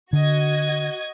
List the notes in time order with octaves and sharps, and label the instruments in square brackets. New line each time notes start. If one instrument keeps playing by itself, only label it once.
[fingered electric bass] D3 [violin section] F#4 D#5 G#6